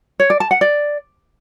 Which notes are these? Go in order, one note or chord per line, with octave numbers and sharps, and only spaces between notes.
C#5
D5
A5
F#5
D5